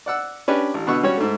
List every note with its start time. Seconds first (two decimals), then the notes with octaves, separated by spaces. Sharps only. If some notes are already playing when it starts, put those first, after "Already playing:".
0.06 D5 F#5 E6
0.48 C#4 D4 G4 B4
0.74 A1
0.87 B2 D3 B3 F#5 C#6 E6
1.03 G3 C#4 F#4 C#5
1.18 G#2 A3